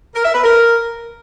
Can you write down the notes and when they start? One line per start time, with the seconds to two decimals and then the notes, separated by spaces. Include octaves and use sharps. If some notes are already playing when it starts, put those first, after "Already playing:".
0.15 A#4
0.25 E5
0.34 B4
0.43 A#4